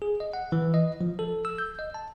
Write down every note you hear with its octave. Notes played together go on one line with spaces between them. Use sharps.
G#4
D#5
F#5
E3
D#5
F3
A4
E6
G6
D#5
A5